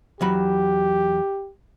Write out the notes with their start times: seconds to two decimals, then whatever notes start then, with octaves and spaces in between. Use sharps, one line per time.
0.21 E2 F#3 G4 B5